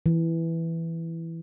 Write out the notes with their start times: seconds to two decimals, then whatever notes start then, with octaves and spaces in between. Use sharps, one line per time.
0.06 E3